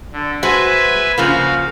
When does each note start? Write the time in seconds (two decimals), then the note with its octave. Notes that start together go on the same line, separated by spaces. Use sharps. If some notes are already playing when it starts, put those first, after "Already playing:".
0.13 D3
0.43 G#3 F#4 B4 C5 E5 G#5
1.18 C#3 F3 A#3 F#4 F5